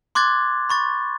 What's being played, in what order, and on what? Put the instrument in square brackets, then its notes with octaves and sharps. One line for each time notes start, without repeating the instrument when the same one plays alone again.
[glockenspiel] C6 D6 F#6 G#6 A6
B5 C#6 A6